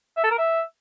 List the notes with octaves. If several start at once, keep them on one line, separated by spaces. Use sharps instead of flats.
E5
A4
A#4
E5